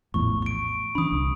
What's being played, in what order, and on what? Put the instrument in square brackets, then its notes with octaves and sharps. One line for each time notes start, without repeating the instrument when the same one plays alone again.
[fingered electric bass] A#1 E2 A2 [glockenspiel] C#6
[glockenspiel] C#6 D7
[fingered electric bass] E3 C#4 D4 [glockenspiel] B5 D#6
[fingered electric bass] C2